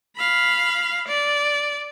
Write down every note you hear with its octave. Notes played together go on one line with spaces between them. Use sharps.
F5 B5
D5